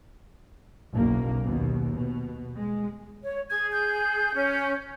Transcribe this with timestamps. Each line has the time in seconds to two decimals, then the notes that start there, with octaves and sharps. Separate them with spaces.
0.92 F#1 B1 A#3
1.43 D#2 B2
1.93 B2
2.56 G#3
3.23 C#5
3.50 G#4 G#6
3.72 G6
4.35 C#4